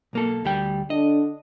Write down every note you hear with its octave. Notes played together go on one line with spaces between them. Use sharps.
B1 A#3 A4
D2 G3 G5
D3 D4 D#5